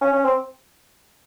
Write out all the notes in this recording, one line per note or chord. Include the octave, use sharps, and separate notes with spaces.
C#4
C#4
C4